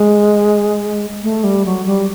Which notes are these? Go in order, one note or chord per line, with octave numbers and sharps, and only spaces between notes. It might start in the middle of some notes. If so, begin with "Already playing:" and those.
Already playing: G#3
A3
G3
F#3
G3